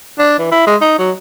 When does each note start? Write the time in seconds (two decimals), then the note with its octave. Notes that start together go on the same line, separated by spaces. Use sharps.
0.19 D4
0.39 E3
0.51 E4
0.67 G#3
0.81 D#4
0.99 F#3